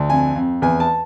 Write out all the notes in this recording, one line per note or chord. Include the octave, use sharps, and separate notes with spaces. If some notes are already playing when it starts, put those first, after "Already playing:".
Already playing: D2
F2 G#5
F2
E2 G#5
A5